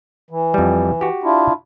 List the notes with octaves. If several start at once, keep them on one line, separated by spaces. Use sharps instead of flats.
E3
F2 G3
F#4 G4
D4 E4 F4